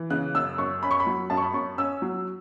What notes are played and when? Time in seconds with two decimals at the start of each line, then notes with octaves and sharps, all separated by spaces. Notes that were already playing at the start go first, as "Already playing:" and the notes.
Already playing: E3
0.10 C#3 F#6
0.35 F#2 E6
0.58 F#2 C#6
0.83 C#4 B5
0.91 C#6
1.00 B5
1.07 F#3
1.30 F#2 A5
1.37 C#6
1.43 B5
1.54 F#2 C#6
1.78 C#4 E6
2.02 F#3